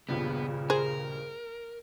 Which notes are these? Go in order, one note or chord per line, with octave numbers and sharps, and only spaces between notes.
D#1 C#2 G2 C#3 B3
G#4 A#4 C5